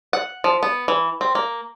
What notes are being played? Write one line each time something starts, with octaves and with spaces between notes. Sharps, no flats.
F#5
F3
B3
E3
C4
A#3